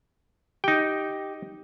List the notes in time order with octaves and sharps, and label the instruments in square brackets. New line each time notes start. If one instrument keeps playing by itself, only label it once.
[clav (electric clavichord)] D#4 G5 [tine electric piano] G4